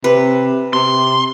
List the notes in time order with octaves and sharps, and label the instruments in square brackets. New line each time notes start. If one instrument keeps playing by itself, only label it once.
[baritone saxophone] C3 [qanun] B4
[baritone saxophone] C3 [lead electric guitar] C6